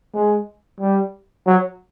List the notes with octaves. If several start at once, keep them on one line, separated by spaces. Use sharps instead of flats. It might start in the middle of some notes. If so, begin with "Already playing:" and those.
G#3
G3
F#3